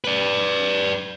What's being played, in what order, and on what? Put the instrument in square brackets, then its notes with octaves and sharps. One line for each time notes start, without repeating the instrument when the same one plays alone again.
[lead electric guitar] B4 D5